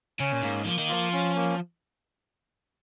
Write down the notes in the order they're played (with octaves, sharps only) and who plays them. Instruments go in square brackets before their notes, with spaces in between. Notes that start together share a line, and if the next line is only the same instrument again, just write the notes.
[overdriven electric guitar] C#3 [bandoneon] C#4
[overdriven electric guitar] A#2
[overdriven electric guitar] G#2 [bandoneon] A#3
[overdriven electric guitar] F3 [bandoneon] A#3
[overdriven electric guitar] D#3
[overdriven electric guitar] F3 [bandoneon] F4
[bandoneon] C#4
A#3